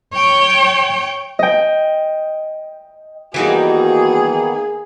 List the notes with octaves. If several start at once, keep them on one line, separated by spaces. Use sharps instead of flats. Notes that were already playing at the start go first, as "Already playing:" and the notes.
C#5 G5
D#5 G5
D#3 E3 G3 A#3 B3 D#4 F#4 G#4